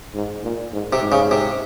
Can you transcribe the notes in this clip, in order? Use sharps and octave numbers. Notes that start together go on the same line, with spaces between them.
G#2
A#2
G#2
C3
G#2
C#3
C3